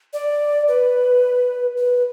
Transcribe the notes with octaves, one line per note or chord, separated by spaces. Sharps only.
D5
B4
B4